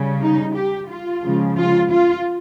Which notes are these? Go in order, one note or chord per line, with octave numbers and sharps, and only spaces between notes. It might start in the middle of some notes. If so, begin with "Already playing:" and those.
Already playing: C#3 G3
D#4
G4
F4
C#3 F3 G#3
F4
F4